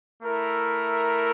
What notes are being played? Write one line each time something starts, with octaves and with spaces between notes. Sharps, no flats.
A3 E4 A#4